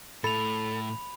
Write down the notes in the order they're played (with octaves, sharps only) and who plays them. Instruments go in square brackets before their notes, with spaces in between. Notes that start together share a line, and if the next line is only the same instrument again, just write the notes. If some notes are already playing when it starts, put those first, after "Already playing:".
[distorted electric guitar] A2 [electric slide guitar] A4 [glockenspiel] B5 F7